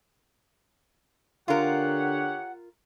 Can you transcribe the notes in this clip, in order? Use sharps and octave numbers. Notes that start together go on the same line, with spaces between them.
D3 F4 G4 A#4 C#5 F#5